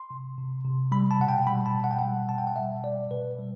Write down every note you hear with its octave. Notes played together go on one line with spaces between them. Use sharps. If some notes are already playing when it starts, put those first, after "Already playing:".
Already playing: C6
C3
C3
C3
G3 B5
A5
B2 F#5
G5
G3 B5
A5
B2
F#5
G5
G3 F#5
B2 A5
G5
F#5
B2 E5
G3 D5
B2 B4
G3